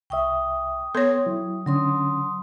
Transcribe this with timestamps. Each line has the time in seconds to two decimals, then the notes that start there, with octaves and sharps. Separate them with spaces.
0.10 C2 E5 G5 C#6 D#6
0.95 B3 A4 C#5 C6 G#6
1.26 F#3 E4
1.66 D3 F#3 C#4 C6 D#6